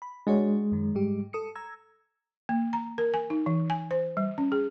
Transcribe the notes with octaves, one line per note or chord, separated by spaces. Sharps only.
B5
G#3 D4 F#4 C#5
F#2 D#3
G#2 G3 G4
A4 D#6 C#7
A#5 E6 G#6
A#3
A#5
A#4
G#5
D#4
E3
G#5
C5
G3
C#4
G#4